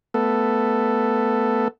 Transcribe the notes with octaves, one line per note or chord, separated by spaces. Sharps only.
A3 B3 A4